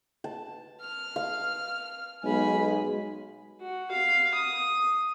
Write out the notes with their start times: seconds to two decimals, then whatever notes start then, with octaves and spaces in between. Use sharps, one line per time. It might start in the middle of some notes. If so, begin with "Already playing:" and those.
0.24 A5
0.81 F6
1.16 F5
2.24 B1 G#3 G#5 B5
3.61 F#4
3.91 F5
4.34 D#6